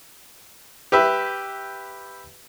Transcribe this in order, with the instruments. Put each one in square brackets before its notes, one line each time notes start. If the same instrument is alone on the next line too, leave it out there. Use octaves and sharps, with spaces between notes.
[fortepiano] G4 B4 E5